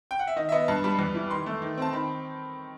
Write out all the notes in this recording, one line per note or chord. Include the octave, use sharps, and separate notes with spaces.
G5
F#5
E5
D#3 D#5
E5
B3 D#5
G2 A5
G3 B5
E2
E3
D#3 C6
A3
D#3
C4 A5
D#3 B5